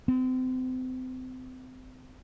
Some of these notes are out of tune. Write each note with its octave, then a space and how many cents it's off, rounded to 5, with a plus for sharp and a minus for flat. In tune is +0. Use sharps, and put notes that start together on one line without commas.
C4 -35